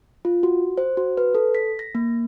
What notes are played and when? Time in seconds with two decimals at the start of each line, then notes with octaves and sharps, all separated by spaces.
0.25 F4
0.43 F#4
0.78 C5
0.97 F#4
1.17 B4
1.35 A4
1.55 B6
1.79 A#6
1.95 A#3